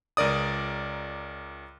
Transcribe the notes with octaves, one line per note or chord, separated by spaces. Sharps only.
C#2 A#4 D5 D#6